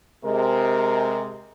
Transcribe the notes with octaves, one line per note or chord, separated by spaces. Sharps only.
C3 G#3 A#4